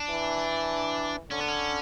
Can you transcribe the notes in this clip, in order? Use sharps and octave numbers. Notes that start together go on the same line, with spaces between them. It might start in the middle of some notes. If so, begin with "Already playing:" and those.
Already playing: D4
E3
D3 C#4
B3
C#4